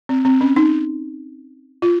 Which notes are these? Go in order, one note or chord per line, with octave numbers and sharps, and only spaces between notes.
C4
C4
C#4
D#4
F4